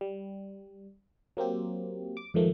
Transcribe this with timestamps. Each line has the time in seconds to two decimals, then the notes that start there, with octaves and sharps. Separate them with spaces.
0.01 G3
1.37 F#3 A#3 C4 G4
2.17 D6
2.34 F2 G#2 D#3 F3 A3 A#3